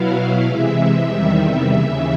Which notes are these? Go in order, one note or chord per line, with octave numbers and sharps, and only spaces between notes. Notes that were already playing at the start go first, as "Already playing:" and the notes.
Already playing: B2 F#3 B3 E4 F5
C3 E3 G#3 E5
E2 C3 D#3 G3 E5
E5
D#2 C#3 E3